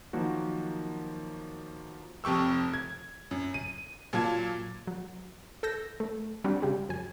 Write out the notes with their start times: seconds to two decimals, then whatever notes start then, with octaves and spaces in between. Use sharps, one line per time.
0.13 D#3 F3 F#3 A#3 F#4
2.24 F1 F2 G4 C#6 E6
2.74 G#6
3.31 F#2
3.54 D#7
4.13 A#2 F#3 F4 A5 G#6
4.87 F#3
5.63 A4 E6 G6 A#6
6.00 A3
6.44 G3 C4 D4 F#4
6.62 C#3 G3 G#3
6.89 F#2 G#5